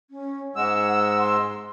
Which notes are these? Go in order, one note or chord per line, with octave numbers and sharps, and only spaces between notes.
C#4
G#2 G#3 F#5 E6
C6